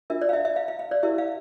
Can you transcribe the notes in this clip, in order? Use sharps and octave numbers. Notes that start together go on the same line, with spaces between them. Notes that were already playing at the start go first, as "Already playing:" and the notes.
D4 F4 A#4 E5
D5
F5
E5
E5
F5
F5
F5
D5
E4 G4 A#4 E5
F5